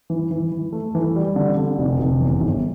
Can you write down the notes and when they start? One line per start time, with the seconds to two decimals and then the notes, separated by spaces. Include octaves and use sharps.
0.10 E3
0.31 E3
0.52 E3
0.72 A3
0.95 E3
1.16 G3
1.36 D3
1.57 D3
1.78 F1
1.99 F1
2.20 E2
2.41 G1